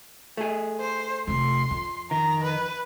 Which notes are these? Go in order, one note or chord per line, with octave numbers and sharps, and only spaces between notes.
A3 G#4
C5
F1 F2 C6
F2
D#3 A#5
B4